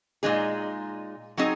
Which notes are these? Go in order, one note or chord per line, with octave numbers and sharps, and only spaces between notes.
A#2 G#3 D#4 G#4
F#3 C4 D#4 G#4